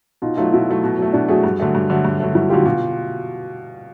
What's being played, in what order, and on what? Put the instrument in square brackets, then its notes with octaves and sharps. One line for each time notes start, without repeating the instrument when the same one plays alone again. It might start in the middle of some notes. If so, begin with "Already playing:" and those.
[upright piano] B2 [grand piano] D#4 F4
[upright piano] F#3 A3 [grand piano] D#4 F4
[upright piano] B2 [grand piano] E4 F#4
[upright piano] F#3 A3
B2
F#3 A3
[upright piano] B2 [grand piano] D4 E4
[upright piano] F#3 A3 [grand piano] F#4 G#4
[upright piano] G2
D3 F#3 A3
G2
D3 F#3 A3
G2
D3 F#3 A3
[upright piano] G2 [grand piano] E4 F#4
[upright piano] D3 F#3 A3 [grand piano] F4 G4
[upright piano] B2 [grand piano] F4 G4